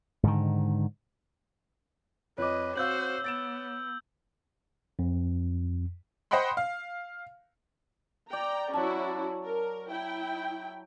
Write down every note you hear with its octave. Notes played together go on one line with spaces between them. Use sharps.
G#2 D3 D#3
F2 B4 C#5 D#5 D6
C4 F#4 C5 F5 E6 G6 F#7
B3 A6 D7 E7
F2
C5 D#5 F#5 G5 B5 C6
F5
D5 G5 A#5
F#3 C#4 E4 F#4 A5
A#4
E4 G5